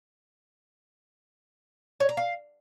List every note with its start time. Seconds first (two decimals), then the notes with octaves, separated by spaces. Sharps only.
2.00 C#5
2.09 A#5
2.17 F5